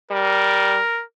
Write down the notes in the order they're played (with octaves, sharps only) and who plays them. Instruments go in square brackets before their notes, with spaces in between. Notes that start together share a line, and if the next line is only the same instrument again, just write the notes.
[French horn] G3 [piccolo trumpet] A#4